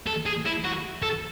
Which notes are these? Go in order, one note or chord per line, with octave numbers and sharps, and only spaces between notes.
A4
G#4
E4
F#4
A4